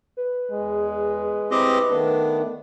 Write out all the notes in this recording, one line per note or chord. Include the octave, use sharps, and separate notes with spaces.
B4
E2 G#3
C4 E4 G4 D#5
D#3 A3 B3 D4 B4